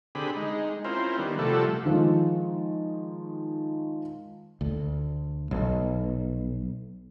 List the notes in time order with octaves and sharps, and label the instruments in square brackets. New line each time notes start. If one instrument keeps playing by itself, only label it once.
[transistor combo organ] D3 C4 G4 G#4 B5
G#3 D#4
C4 C#4 E4 F4 A#4 C5
D#3 G3 B3
C3 F3 G3 A3 F#4 A4
[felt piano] D#3 F3 G#3
[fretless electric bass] D2
B1